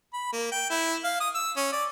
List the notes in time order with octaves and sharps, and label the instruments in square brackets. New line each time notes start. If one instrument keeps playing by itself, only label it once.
[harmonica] B5
A#3
G5
E4
F5
D#6
E6
C#4
D5